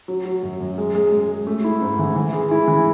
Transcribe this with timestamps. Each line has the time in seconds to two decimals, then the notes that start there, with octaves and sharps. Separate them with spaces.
0.08 F#3
0.26 F#3
0.43 F#2
0.61 F#2
0.78 G#3
0.95 G#3
1.12 G#3
1.29 G#3
1.47 A3
1.64 E4
1.82 G#2
1.99 E3
2.16 E3
2.33 G#3
2.51 E4
2.68 E3